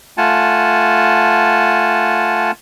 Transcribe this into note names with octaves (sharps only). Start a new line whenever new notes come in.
A3 F4 F#5 G#5 A5